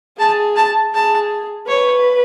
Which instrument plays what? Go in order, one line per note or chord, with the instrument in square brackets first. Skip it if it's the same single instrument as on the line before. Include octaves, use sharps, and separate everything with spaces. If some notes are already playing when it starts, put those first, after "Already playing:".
[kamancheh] G#4 [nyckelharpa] A5
[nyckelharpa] A5
[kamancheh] G#4 [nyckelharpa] A5
[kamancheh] B4 [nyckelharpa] C#5